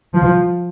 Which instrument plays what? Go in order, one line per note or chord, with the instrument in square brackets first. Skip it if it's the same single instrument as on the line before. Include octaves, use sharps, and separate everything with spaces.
[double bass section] F3